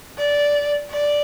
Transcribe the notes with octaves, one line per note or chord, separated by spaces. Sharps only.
D5
D5